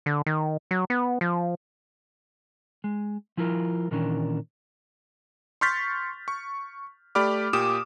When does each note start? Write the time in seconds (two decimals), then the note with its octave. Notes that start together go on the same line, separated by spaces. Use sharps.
0.06 D3
0.26 D#3
0.71 F#3
0.90 B3
1.21 F3
2.84 G#3
3.37 F3 E4 F4 A#4
3.91 A#2 D#3 E3 C#4 D4 A#4
5.61 C6 C#6 F6 G6 A6 B6
6.28 C#6
7.15 A3 G4 D5 B5 D6 F6
7.53 A#2 G4 D6 D#6 E7